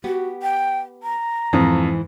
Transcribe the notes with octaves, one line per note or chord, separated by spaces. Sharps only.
B3 F#4 G4
G5
A#5
F2 G#2 E3